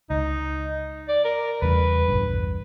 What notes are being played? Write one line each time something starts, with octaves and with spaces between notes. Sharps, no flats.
C#2 D#4
D5
A#4
E2 C#3 G3 B4
A#1 E2 G2